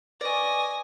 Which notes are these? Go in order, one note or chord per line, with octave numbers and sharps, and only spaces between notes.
B4 D5 D#5 G#5 C#6 A#6